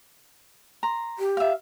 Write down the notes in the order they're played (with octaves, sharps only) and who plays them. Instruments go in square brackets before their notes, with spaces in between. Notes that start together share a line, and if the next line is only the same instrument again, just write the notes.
[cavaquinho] A#5 C6
[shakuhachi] G4
[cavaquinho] E5 F5